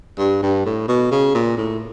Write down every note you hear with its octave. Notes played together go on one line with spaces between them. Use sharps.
G2
G2
A2
B2
C#3
A#2
A2